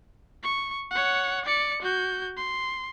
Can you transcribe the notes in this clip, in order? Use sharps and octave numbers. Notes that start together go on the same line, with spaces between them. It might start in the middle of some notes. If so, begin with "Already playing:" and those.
C#6
C#5 F#5
D5 C#7
F#4 G6
C6